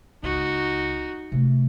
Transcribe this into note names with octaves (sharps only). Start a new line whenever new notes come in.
C#2 D#4 F#4
C3 A3